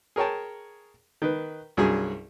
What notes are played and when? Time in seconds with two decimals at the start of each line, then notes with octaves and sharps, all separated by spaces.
0.16 G#4 A#4 C#5 G5 A5
1.22 D#3 B4
1.77 C2 G2 F#3 C#4 G#4